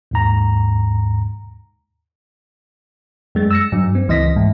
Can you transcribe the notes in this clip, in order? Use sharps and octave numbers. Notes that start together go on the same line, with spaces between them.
D#2 G#2 A#5
F#2 G#3 A6
E6 A#6 C#7
G2 F#3
C4
C#2 E3 D#5 A#6 B6
G#2